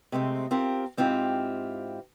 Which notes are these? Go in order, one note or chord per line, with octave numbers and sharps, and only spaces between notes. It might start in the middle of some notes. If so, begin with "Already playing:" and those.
C3 G#3 A3 C4
C4 F4 G4 A#4
G#2 C4 E4 F4 G4